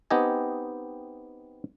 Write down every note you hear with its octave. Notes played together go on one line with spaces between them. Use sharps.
B3 C4 D#4 G4 D#5 G#5